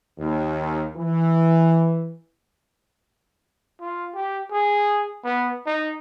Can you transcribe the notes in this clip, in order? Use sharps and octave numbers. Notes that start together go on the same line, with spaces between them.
D#2
E3
F4
G4
G#4
B3
D#4